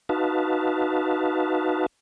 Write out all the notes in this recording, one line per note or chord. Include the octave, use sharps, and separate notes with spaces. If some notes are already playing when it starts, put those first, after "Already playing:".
D#4 F#4 B4 F5 A5